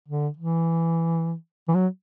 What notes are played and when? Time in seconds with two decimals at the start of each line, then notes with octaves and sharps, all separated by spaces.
0.08 D3
0.37 E3
1.68 E3
1.74 F#3